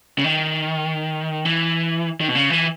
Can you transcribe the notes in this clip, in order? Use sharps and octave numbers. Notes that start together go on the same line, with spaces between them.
C#3
D#3
E3
D#3
B2
C#3
E3